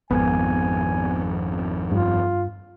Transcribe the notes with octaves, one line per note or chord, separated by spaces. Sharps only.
G#1 F2 B3 G#5
G2 F4